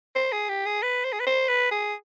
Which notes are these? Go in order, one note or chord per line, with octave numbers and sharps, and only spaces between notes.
C5
G#4
G4
G#4
B4
C5
G#4
B4
C5
B4
G#4